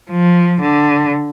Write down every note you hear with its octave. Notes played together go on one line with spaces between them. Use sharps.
F3
D3